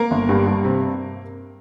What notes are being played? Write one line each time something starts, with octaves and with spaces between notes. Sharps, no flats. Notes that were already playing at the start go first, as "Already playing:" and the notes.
Already playing: A#3 A#4
G1
G2
G2
C3